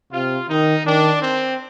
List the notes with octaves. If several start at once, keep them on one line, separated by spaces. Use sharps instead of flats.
C3 F4
D#3 D#4
D#3 D4
C4